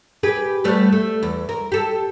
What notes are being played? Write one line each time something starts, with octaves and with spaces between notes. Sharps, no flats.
G4 G#4 B4
G3 A3 B3
A3
E2
A#4
G4 A4